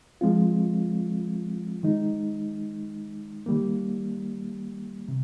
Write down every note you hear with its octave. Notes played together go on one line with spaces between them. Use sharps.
F3 G#3 C4 F4
D#3 G#3 D#4
D#3 G3 A#3
C3